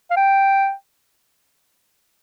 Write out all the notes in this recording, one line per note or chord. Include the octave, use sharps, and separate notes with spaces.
F5
G5